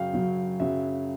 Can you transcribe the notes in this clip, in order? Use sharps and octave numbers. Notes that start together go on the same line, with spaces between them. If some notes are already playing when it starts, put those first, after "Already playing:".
Already playing: F#2 C#3 F#3 F5 G5
F#2 C#3 F#3
F#2 C#3 F#3 E5